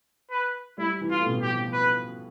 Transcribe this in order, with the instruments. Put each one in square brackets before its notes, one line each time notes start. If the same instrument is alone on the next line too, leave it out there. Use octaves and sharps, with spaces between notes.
[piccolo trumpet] B4
[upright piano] G3 [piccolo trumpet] E4
[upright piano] E3
[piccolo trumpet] F4
[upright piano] A2
B2
[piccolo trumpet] G4
[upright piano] F3
[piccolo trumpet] B4